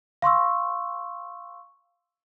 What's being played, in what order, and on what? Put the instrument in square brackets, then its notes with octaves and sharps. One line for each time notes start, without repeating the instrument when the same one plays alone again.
[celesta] F5 C6 C#6 E6